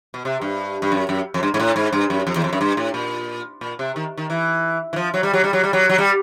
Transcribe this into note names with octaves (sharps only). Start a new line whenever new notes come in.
B2
C3
G2
G2
F#2
F#2
F2
G2
G#2
A2
G#2
G2
F#2
F2
E2
F2
F#2
G2
A2
A#2
A#2
C3
D#3
D#3
E3
E3
F3
F#3
G3
F#3
G3
F#3
G3
F#3
F#3
G3